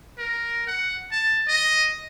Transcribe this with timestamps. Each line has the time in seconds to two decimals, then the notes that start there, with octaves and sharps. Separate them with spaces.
0.18 A#4
0.67 F#5
1.12 A5
1.48 D#5